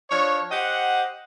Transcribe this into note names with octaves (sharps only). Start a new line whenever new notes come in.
F3 D4 C#5
G4 C5 D#5 F#5